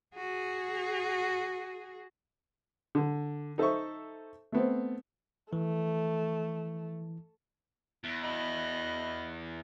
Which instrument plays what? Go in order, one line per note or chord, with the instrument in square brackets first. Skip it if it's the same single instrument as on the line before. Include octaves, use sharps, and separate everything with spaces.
[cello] F#4 G#4
[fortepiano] D3
D#4 A4 C5 E5 C#6
A3 B3 C4
[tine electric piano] E3 [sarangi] A3
[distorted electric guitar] E2
[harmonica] D#5 B5